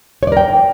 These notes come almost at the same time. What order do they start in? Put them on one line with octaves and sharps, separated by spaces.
C#5 D5 A#4 G5